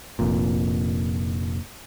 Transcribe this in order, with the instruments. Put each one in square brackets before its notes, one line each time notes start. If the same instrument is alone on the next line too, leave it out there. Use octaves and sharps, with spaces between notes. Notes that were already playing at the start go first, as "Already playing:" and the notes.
[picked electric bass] F1 F2 A#2